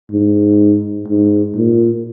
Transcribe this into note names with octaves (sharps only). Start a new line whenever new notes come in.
G#2
G#2
A#2